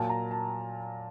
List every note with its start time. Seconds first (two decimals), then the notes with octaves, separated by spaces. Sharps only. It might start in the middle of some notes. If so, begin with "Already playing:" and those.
Already playing: A#2 F#3 A#3 A5
0.09 A#5
0.31 A5